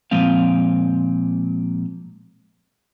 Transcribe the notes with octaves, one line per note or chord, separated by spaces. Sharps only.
A#2 F3 G#3 C4 F5